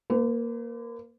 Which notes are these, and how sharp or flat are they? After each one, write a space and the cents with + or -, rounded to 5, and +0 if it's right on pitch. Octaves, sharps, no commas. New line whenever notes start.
A#3 +0 B4 +45